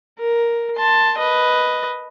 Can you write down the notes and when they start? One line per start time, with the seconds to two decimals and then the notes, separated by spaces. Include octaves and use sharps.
0.19 A#4
0.76 A5 C6
1.18 B4 D#5